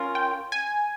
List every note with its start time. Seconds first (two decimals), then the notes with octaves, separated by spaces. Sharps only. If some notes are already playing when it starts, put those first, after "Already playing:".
Already playing: C#4 F4 A#4
0.15 G5
0.52 G#5